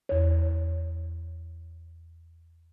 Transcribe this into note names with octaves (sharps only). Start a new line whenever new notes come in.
E2 C#5